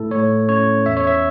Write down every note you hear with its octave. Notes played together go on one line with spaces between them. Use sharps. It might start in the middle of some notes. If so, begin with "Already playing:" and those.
Already playing: A2 A3 E4 A4
A2 C#5
C#4 C#5
E2 E5
C#5
E5